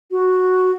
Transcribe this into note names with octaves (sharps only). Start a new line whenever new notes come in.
F#4